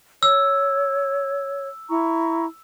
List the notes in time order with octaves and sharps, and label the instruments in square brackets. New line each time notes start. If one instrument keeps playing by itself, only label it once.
[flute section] C#5 [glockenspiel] E6
[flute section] E4 A#5 C#6